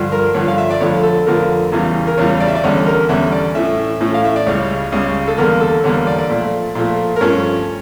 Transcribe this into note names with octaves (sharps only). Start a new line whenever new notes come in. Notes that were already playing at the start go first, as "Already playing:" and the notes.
Already playing: G2 D3 F3
A#4
G2 D3 F3 C#5
F5
E5
D5
F2 D3 F3 A3 C#5
A4
F2 D3 F3 A3 A#4
E2 C#3 E3 G3
A#4
E2 C#3 E3 G3 C#5
D5
E5
D5
E2 D3 G3 C#4 C#5
A#4
E2 D3 G3 C#4 E5
D5
A2 E3 A3 C#4 E5
A2 E3 A3 C#4
F5
E5
D5
C#2 C#3 G3 C#5
C#2 C#3 G3
A4
E2 D3 G3 A#3 A#4
A4
E2 D3 G3 A#3 C#5
D5
D5
A#2 F3 A3
A#2 F3 A3
A#4
G2 F3 A3 C#4 C#5